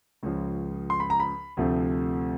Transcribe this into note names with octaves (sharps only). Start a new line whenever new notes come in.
C#2 C#3 F3
C6
B5
A#5
B5
D2 C3 F3 A3